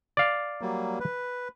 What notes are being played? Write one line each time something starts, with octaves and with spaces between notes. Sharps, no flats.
D5 F5
F#3 G3 A#3
B4